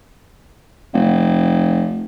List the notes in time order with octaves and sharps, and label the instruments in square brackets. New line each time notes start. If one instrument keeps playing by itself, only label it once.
[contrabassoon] F1